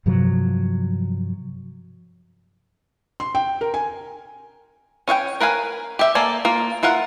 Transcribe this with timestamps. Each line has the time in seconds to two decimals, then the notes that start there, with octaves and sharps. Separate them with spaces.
0.06 G2 C3 F3 F#3
3.20 C6
3.35 G5
3.61 A#4
3.74 G#5
5.08 C#4 C#5 F5 G5
5.40 A#4 B4 F5 G#5
5.99 G4 E5
6.15 A#3 A4 D5 G#5
6.45 A#3 F4
6.83 E4 F4 A#4 F#5